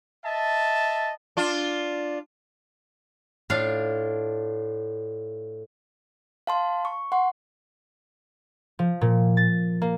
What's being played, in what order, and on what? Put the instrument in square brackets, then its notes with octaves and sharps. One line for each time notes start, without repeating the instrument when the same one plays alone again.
[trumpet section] D#5 E5 A5
[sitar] D4 F4
[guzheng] A2 D4 F4 F5
[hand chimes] F5 A5 C6
C#6
F#5 C6
[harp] F3
A#2
A6
A#3